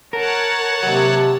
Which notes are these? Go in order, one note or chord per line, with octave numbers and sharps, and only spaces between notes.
A#4 C#5 F#5 A5
D#2 C3 F#3